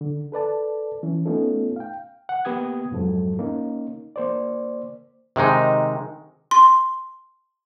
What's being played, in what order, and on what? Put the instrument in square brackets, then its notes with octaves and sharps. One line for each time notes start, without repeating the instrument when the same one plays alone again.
[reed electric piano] D3
A4 B4 D5 A5
E3 C#4
A3 B3 C#4 D#4 F4 A4
F5 G5
F#5
A#3 B3 G4 D#6 G#6
F2 G#2 F3 F#3 A4
A#3 C#4 D#4
A#3 C5 D5
[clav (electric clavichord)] C3 D#3 G#3 D#4
[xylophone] C6